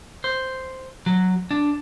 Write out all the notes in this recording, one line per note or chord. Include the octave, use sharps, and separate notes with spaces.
C5
F#3
D4